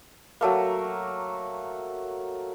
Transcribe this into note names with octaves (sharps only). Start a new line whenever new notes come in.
F#3 A3 A#3